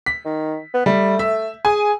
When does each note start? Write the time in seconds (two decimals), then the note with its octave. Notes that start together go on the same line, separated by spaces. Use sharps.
0.06 B6
0.25 D#3
0.74 B3
0.86 G3 A3
1.19 E5
1.65 G#4 G#5